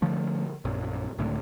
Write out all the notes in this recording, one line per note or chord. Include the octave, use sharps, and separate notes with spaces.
D3 F3 A3
A#1 F#2
C#2 A2 D3